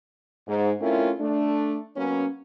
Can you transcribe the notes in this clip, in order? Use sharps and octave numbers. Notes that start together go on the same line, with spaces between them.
G#2
A3 C4 C#4 E4 F4 A#4
A3 D4
F#3 A#3 B3 C#4